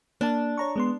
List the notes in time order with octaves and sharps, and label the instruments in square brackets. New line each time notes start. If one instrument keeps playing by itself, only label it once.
[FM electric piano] A#3 A5 [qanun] D4
[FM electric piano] C#5 A#5 C#6
G#3 B3 C6